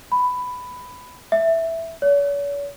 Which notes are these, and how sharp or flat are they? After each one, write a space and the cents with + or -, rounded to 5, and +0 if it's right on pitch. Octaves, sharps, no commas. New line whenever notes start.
B5 +10
E5 +0
C#5 +45